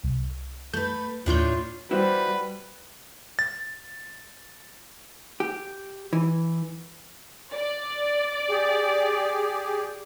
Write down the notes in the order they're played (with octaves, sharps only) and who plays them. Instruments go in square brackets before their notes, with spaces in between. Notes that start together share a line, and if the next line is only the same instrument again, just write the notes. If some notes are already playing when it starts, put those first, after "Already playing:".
[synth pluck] C2
[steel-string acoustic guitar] A3 B4 [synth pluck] G6
[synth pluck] D#2 G6 [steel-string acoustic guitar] A2 D4 C#5 [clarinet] F4
[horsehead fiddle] G3 [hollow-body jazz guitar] E4 F#4 C5 [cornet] B4
[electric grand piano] A6
[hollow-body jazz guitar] G4
E3
[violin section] D5
[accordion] G4 G#4